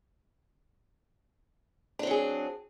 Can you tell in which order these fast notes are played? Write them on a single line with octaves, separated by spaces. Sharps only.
D4 C4 F#3 G#4